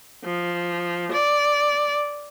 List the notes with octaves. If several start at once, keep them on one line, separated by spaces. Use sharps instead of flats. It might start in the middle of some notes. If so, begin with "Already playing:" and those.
F3
D5